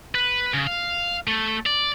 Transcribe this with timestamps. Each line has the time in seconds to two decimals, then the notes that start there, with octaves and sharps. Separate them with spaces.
0.15 B4
0.54 C#3
0.67 F5
1.27 A3
1.66 D5